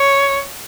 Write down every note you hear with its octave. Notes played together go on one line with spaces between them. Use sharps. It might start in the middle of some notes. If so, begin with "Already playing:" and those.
Already playing: C#5